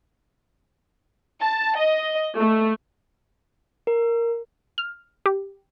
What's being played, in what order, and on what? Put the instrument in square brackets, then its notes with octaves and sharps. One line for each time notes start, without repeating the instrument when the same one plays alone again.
[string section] A5
D#5
A3
[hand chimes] A#4
[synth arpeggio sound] F6
G4